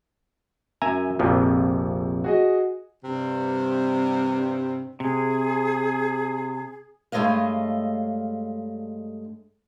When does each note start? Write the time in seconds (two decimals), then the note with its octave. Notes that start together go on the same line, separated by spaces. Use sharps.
0.82 F#2 E5 G#5 A#5
1.19 A#1 F2 C3 F3
2.24 F#4 G#4 D#5
3.03 G2 C3
5.00 C3 G#4
7.12 G2 G#3 A3 C#5 D#5 F5